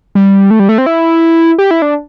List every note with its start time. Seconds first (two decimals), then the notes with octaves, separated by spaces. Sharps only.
0.15 G3
0.51 A3
0.60 G3
0.69 A3
0.78 C4
0.86 E4
1.58 G4
1.71 E4
1.82 D4